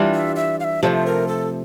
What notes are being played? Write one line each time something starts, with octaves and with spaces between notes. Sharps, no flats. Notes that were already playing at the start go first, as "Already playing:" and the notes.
Already playing: E3 G3 D4 F4
E5
E5
F5
E5
C3 F3 A3 C5 D5
A#4
A4